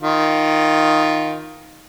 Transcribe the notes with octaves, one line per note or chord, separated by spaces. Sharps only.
D#3 F4